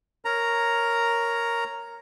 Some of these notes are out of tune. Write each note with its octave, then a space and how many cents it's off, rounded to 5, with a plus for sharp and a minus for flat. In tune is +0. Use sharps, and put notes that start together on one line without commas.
A#4 +0 C#5 +0 A#5 +0